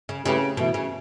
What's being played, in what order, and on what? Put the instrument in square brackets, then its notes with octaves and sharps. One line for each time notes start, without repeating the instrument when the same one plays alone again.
[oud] C#3
[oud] C#3 [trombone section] A3 E4 G4 B4
[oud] B2 [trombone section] E3 A3 E4
[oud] C#3